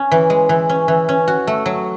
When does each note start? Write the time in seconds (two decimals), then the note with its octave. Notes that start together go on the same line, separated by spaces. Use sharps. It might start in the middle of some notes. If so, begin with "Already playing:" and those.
Already playing: C#4
0.11 E3
0.30 G#3
0.49 E3
0.69 C#4
0.88 E3
1.09 C#4
1.28 F#4
1.47 A3
1.66 F#3